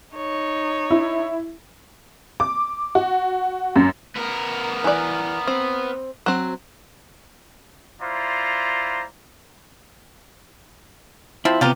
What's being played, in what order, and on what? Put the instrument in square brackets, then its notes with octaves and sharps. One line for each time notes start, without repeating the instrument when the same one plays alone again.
[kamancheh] D#4 C#5
[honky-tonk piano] E4
D6
F#4
F#2
[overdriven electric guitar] B3 A#4
[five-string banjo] E3 D5
C4
F#3 C4
[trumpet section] E4 F4 C5 D5 A#5
[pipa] F3 C4 [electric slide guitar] E4
[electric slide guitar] C3 B3 [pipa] F4 G4 A#5